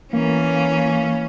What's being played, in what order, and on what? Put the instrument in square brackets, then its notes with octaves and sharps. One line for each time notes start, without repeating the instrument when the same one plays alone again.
[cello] E3 C#4 [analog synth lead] A#3